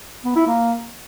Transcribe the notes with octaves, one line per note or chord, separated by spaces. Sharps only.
B3
E4
A#3